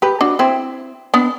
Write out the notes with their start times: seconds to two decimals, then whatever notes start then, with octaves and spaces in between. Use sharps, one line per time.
0.02 G4 B4
0.21 D4 F#4
0.39 C4 E4
1.14 B3 D4